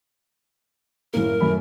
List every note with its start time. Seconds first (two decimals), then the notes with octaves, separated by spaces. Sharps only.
1.14 F#1 A2 A#3 A#4
1.40 F#2 A3 B5